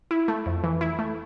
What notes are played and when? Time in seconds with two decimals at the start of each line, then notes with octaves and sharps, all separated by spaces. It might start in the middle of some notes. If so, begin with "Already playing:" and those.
0.11 E4
0.28 A3
0.46 F2
0.64 E3
0.81 E4
0.99 A3